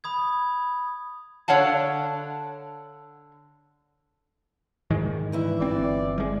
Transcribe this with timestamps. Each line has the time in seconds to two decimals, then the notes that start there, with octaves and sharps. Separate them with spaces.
0.04 B5 D#6 G#6
1.48 D3 C#5 F5 F#5 A5
4.90 G#2 D#3 G#3
5.32 G2 E3 E4
5.60 G1 C4 D5
6.18 G3 G#3